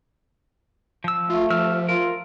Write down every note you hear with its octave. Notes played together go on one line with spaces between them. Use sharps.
F3 E6
A3 F4
F3 G4 E6 F6
F4 A#4